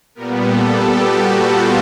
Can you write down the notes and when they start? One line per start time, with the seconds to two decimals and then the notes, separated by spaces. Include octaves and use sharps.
0.15 A#2 G3 B3 A#4
0.46 A4
0.78 G4
1.10 F#4
1.42 F4